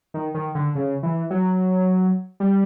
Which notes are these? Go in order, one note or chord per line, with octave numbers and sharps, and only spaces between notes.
D#3
D#3
D3
C#3
E3
F#3
G3